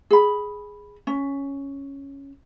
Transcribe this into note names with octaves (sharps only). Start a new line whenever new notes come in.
G#4 B5
C#4